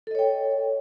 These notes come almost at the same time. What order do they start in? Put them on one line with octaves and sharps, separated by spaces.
A4 D#5 C#5 G5